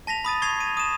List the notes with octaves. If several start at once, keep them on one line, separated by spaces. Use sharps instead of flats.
A5 A#6 B6 F7
B5 D#6 A6 D#7
C#6 G#6 A6 C7 F7
D#7
D#6 D#7 E7